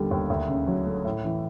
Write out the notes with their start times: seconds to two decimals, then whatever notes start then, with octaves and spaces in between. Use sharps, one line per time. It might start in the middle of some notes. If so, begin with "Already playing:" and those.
Already playing: D#2 D3 G3 B3
0.11 D#2
0.30 D2
0.48 C#3
0.67 F#3
0.87 A3
1.05 A2
1.25 E3